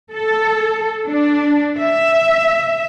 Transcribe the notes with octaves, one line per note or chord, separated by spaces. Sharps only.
A4
D4
E5